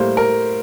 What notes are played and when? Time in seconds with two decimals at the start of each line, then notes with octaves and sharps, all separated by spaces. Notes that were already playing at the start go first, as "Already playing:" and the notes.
Already playing: A2 G3 A#3 C5
0.17 A#4